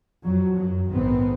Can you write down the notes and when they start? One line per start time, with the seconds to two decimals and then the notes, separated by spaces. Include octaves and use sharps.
0.23 F2 F#3
0.56 F#2 F#3
0.88 A#1 G#2 D#3 B3 C4